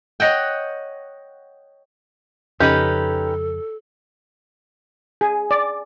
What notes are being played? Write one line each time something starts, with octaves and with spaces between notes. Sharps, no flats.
C#5 D#5 F#5 G5
F2 C#3 C#4 D#4 G4 A4 B4
G#4
D5